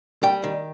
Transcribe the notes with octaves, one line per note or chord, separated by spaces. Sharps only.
G3 G5
D#3